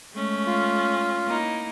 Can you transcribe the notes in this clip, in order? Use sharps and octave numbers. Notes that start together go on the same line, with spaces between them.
G#3 A3 C#4
F4
A#3 D#4 E4